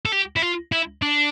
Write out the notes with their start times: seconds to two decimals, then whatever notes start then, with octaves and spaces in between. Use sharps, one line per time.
0.06 A4
0.12 G4
0.36 E4
0.42 F4
0.72 E4
1.02 D4